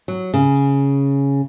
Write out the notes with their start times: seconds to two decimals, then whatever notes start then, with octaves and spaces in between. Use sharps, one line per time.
0.08 F#3
0.34 C#3